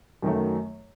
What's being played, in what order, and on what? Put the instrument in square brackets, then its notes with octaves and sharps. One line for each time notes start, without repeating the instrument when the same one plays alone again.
[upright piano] F#2 D#3 F#3 A3